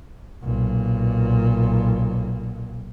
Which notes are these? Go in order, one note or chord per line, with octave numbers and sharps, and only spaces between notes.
B1 A#2